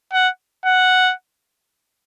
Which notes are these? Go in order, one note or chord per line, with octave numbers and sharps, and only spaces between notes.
F#5
F#5